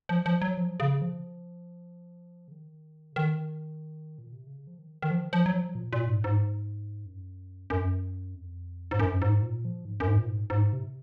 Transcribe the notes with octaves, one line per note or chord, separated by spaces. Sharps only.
F3
F3
F#3
F3
C#3
F3
C#3
D#3
C#3
D#3
A#2
C3
C#3
F3
D#3
D#3
F3
F3
F#3
F3
A#2
A#2
G#2
G#2
F#2
F#2
F2
G#2
F#2
G#2
A#2
F3
G#2
F#2
G#2
A#2
G#2
G#2
C3